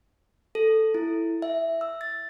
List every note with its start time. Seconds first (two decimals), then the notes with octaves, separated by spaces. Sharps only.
0.55 A4
0.94 E4
1.42 E5
1.81 E6
2.01 A6